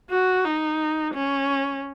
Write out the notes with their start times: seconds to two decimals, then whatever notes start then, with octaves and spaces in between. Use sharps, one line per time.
0.10 F#4
0.44 D#4
1.14 C#4